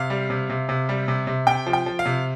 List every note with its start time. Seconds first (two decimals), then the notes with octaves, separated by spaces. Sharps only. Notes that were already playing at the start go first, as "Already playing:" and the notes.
Already playing: C3 F5
0.10 G3
0.30 C3
0.50 C3
0.69 C3
0.89 G3
1.08 C3
1.27 C3
1.47 C3 G5
1.66 F3
1.73 G5
1.86 F3
1.99 F5
2.06 C3